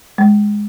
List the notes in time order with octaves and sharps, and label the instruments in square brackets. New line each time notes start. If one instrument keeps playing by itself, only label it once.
[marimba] G#3